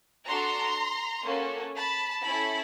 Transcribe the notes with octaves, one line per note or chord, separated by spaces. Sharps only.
D4 F#4 A4 A#5 C6
A#3 C#4 F#4 A4
A5 B5
C#4 E4 A4 A5 B5